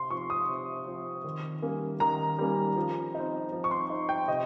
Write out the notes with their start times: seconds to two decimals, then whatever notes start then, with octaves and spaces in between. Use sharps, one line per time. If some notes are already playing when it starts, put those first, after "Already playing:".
Already playing: C3 C6
0.10 F3 C4 C#6
0.30 D#6
0.48 C3
0.87 F3 C4
1.24 D#3
1.62 G3 A#3 C#4
2.00 D#3 A#5
2.38 G3 A#3 C#4
2.76 F3
3.14 C4 D#4
3.52 F3
3.64 C#6
3.71 C6
3.90 C4 D#4
4.09 G5
4.28 C3 D#5